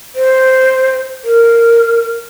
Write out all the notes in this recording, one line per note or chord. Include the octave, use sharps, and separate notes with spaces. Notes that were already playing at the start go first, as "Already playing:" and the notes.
C5
A#4